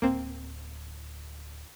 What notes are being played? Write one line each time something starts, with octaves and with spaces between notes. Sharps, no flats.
D1 A#3 C4